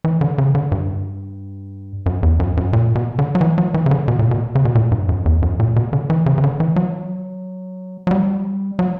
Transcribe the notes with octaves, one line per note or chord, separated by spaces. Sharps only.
E3
D3
C#3
D3
G2
F#2
E2
F#2
F#2
A#2
B2
D3
F#3
E3
F#3
E3
C#3
D3
B2
A#2
B2
C#3
B2
A#2
G2
F#2
E2
F#2
A#2
B2
D3
E3
C#3
C#3
D3
E3
F#3
F#3
G3
F#3